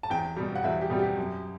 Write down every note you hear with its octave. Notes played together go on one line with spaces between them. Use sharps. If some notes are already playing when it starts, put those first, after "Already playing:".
A5
E2 G5
B2 G3
F#5
E2 E5
G4
B2 G3
G4
F#2